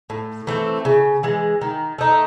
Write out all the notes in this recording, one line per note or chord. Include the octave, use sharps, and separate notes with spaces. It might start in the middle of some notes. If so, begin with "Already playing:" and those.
A2
E3 A3 C4
C#3
E3 G#3
D#3
A3 D#4